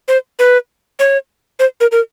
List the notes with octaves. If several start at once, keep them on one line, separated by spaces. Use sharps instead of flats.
C5
B4
C#5
C5
A#4
A#4